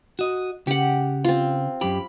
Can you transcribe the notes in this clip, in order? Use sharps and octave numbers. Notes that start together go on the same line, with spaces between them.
F#4 D#5
C#3 G4 F#5
C4 F4
F#2 G4 B5